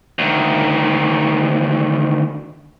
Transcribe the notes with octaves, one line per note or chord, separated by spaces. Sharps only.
D2 D#3